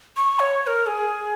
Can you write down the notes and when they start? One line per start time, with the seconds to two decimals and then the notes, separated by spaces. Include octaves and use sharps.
0.17 C#6
0.39 C#5
0.63 C#5
0.67 A#4
0.86 G#4